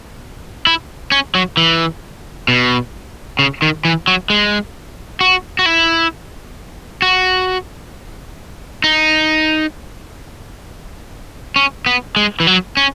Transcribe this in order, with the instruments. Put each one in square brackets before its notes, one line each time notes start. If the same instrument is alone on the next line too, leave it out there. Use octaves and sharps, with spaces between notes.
[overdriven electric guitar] E4
C#4
F#3
E3
B2
C#3
D#3
E3
F#3
G#3
F#4
F#4
E4
F#4
D#4
C#4
B3
G#3
E3
F#3
C#4